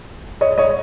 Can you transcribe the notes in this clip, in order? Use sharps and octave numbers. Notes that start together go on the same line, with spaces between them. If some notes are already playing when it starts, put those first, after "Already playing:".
C#5 D#5
C#5 D#5